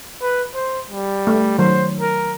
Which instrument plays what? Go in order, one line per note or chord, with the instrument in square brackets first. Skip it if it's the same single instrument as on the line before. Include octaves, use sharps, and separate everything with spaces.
[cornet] B4
C5
G3
[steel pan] A3
[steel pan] D#3 F#3 [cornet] C5
[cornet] A#4